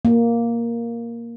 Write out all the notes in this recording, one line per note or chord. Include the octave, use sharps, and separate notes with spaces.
A#3